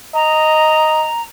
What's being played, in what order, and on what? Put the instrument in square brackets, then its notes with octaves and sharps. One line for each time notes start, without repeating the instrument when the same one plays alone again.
[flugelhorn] D#5 [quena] A#5